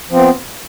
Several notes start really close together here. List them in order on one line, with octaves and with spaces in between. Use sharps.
F3 C4 B3